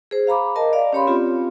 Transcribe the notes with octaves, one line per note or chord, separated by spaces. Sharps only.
G#4 C5
F5 A#5 B5 D6
A#4 D#5 A5 A#5
D5 F5
C#4 G4 C#5 B5 C6
C4 F4 G4